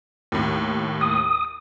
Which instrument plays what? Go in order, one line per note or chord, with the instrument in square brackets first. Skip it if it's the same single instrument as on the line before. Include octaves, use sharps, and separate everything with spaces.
[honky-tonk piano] D#2 A2
[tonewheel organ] D#6